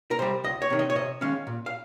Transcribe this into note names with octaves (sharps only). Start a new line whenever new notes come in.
A#4
C3 G3 C5
C#2 D#5
C#5
C3 D#3
D#5
C#5
C3 D#5
D#3 G#3 C#4 F5
A#2
F5